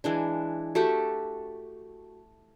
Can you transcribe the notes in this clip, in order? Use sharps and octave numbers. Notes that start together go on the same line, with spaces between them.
E3 G#3 D4
A3 F#4 G4 A4